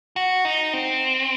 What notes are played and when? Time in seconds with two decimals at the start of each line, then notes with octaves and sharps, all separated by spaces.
0.16 F#4
0.45 D#4
0.73 C4